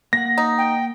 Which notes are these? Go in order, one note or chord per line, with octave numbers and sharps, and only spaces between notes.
A#3 F#5 A#6
D#4
G5